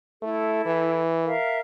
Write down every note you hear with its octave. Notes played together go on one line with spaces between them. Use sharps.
A3 E4 A4
E3
A#4 E5 F5